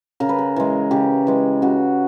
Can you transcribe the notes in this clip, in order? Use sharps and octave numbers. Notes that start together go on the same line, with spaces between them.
C#3 A#4
B4
A#4
E3 G#3
C#3 G4
E3 G#3
C#3 F#4